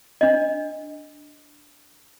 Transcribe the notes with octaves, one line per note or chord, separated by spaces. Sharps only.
D4 D#5